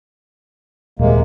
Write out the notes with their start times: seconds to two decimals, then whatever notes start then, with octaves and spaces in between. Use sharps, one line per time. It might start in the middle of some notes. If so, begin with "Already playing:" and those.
0.99 D#1 C3 G#3 A#3